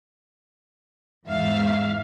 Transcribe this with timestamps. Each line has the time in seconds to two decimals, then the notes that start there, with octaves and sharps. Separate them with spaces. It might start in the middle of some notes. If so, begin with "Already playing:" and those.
1.26 E2 G#2 E5 F5